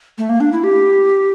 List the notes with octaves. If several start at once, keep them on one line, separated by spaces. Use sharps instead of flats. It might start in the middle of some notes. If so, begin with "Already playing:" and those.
A3
A#3
D4
E4
G4